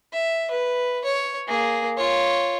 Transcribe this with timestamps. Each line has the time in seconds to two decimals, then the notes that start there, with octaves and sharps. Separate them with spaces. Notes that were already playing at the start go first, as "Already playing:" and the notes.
0.13 E5
0.51 B4
1.05 C#5
1.48 A#3 G#4
1.97 F4 C#5